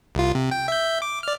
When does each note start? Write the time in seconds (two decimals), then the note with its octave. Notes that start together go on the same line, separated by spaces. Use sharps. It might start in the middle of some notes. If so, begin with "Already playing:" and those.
0.15 C2 F4
0.35 C3
0.51 G5
0.68 E5 G6
1.02 D6
1.23 D5 F6